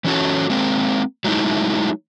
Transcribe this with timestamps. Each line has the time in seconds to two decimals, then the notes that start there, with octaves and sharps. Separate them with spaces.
0.04 E3 A3 C#4 F#4 A4 C#5
0.50 G#3 A#3 C4
1.24 F#3 G#3 A3 D#4 E4